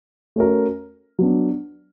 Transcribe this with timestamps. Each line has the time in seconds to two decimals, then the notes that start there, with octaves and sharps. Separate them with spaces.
0.36 A3 C#4 F#4 A#4
1.19 F#3 B3 D4